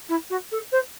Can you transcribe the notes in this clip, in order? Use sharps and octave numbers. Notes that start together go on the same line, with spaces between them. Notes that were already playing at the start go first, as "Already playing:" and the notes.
E4
F#4
A4
C5